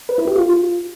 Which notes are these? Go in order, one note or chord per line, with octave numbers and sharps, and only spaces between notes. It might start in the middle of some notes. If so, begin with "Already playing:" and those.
B4
E4
G4
F4